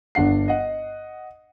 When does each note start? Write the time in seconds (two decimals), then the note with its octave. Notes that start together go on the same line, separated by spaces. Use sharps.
0.15 G1 D4 F#5 C7
0.48 D#5 F#5